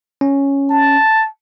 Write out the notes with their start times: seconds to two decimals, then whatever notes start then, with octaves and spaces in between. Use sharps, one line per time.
0.21 C#4
0.71 A5